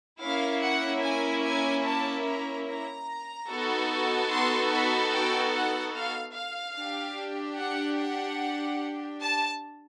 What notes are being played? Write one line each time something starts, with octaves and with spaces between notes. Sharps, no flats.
A#3 C#4 E4 F5
F#5
G#5
G#5
A5
A#5
A#5
B3 D#4 F#4 A4
C6
B5
G5
F#5
F5
F5
D4 G4
F#5
F#5
A5